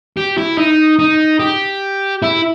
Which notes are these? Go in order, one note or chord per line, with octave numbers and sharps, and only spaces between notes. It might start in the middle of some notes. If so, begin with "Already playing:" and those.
G4
E4
D#4
D#4
G4
E4